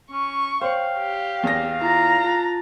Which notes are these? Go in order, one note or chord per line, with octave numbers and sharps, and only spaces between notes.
C#4 C#6
C5 C#5 F5 G5
G4
E2 A#6
E4 F4 A#5 A6
F4 A5 A6